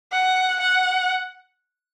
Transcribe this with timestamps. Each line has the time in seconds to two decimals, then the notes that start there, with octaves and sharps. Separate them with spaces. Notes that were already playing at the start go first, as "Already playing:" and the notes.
0.12 F#5
0.60 F#5